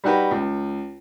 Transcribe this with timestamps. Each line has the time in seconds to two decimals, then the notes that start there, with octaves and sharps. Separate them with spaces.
0.04 G3 D#4 F#4 G4 B4
0.31 C#2